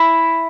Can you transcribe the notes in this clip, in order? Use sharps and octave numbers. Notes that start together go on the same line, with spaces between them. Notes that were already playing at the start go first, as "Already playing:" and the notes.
Already playing: E4